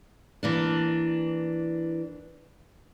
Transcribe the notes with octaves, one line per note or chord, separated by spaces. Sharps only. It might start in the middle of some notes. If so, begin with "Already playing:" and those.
E3 A#3 D4